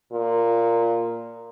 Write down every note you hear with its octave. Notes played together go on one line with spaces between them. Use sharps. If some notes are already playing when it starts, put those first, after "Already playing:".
A#2